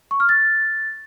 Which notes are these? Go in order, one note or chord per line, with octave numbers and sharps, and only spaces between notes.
C#6
F6
A6